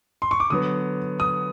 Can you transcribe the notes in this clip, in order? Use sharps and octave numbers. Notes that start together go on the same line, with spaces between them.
C6
C#6
D6
D3 F#3 B3 D#6
D#6